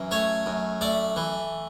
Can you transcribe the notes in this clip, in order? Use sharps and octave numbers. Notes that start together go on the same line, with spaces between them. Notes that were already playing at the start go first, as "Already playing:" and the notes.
Already playing: F#2 E3
A3 C#5
F#2
A3 D5
E3